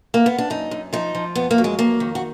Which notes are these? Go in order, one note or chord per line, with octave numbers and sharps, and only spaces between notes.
A#3
B3
D4
F#2 D#4
F#2
F3 D#4
F3
F2 B3
A#3
F#3
G#3
F2 A#3
D#3
F#4